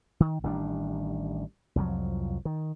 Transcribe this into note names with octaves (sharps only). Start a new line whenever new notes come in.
D#3
A1 D#3 G3 D4
C2 F2 F3 F#3
D#3